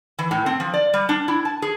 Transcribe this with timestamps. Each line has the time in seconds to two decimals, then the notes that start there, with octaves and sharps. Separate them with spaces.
0.19 E3
0.31 A2
0.46 C4
0.60 F3
0.74 D5
0.93 G3
1.09 D4
1.28 E4
1.45 A5
1.62 G#4